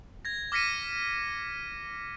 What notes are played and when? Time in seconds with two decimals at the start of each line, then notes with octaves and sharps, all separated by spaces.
0.25 G#6 A#6
0.52 D6 F6 A#6 B6 C#7 D#7